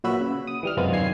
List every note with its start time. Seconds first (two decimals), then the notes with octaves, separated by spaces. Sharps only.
0.04 A#2 F#3 F#4 B4 E5 B5
0.21 C#3
0.47 D#6
0.63 E3 G3 F6
0.77 F#2 C3 G#3 B3 F4
0.91 F#2 D#3 G3 G#5 C7